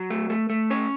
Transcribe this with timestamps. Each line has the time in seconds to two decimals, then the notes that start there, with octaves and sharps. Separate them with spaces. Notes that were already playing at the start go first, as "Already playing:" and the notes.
Already playing: F#3
0.10 A3
0.30 A3
0.50 A3
0.70 C#4 C#5